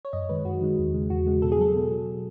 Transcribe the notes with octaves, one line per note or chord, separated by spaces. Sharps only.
C#5
F#2 D#5
D#3 G#3 B4
F#2 F#4
D#3 G#3
E2
C#3 G#3
E2 F#4
C#3 G#3
B2 A4
G#4
F#3 A4
B2
F#3